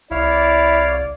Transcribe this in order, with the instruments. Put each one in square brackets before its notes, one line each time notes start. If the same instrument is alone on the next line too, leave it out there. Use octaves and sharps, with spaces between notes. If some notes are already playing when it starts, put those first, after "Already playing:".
[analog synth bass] C2 [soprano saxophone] E4 [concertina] C#5 F5 [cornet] D5